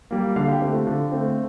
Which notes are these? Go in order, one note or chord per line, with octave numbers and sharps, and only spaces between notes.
G3 A#3
D3 F5
G4
A3 C4 G4
F4
D3
A3 C4